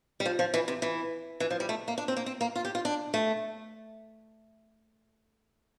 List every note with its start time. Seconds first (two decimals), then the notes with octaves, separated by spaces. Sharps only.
0.20 G3
0.26 F3
0.39 F3
0.54 E3
0.68 C3
0.82 E3
1.40 E3
1.50 F3
1.60 G3
1.69 A3
1.88 A#3
1.98 D4
2.08 C4
2.17 A#3
2.26 C4
2.41 A#3
2.55 F4
2.65 G4
2.75 F4
2.85 D4
3.14 A3